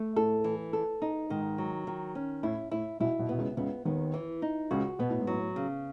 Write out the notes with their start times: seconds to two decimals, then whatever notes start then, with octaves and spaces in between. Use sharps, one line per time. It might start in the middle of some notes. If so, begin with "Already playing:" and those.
Already playing: A3
0.16 A2 A4
0.44 E3
0.73 A4
1.02 D#4
1.30 G#2 D#3
1.58 F#3
1.87 D#3
2.15 C#4
2.43 A2 E4
2.71 A2 E4
3.00 B1 B2 E4
3.19 B1 B2
3.29 B2 B3
3.38 C#2 C#3
3.57 C#2 C#3 B3
3.85 D#2 D#3 B3
4.14 E3
4.42 D#4
4.71 C#2 C#3 F#4
4.99 B2 B3
5.10 A2
5.19 G#2
5.27 A2 F#3
5.56 C#3